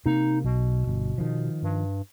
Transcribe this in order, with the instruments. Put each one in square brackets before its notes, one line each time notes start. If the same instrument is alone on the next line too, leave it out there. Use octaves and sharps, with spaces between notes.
[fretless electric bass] C3 A#3 [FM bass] D#4
[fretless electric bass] B1 [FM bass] B2
[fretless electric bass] G1
D#3 F3
[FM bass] G2